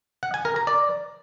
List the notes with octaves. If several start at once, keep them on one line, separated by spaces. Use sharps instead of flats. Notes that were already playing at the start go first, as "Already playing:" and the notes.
F#5
G#5
A#4
A#5
D5